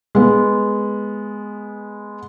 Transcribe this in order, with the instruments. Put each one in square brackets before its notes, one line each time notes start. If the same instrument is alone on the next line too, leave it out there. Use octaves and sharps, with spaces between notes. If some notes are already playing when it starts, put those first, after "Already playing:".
[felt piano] G#3 B3